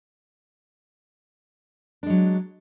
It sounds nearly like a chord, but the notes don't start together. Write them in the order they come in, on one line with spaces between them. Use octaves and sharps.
D4 G#3 F#3